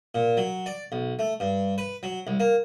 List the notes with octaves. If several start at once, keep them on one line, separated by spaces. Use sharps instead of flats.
A#2
F#3
D5
B1
A3
G2
B4
F#3
C2
A#3